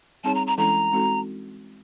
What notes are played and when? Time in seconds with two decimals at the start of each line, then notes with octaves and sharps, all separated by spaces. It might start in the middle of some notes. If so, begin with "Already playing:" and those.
0.24 G3 C4 D#4 G#4 C#5 A5
0.35 A#5
0.47 A#5
0.58 E3 G#3 C#4 E4 A4 A#5
0.92 G#3 C4 D#4 F#4 A4